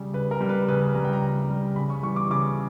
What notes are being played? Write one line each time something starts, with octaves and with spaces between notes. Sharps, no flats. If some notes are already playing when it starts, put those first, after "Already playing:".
Already playing: C#3 G3
C#3 B4
A#4
G3
B4
C#3 B4
G3 A#5
G5
A#5
C#3
G3
C#3 B5
C#6
E3 G3 C#6
D6
C#3 D6